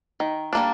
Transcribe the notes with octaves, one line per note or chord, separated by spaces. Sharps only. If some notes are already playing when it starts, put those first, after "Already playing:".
D#3
G3 A#3 D4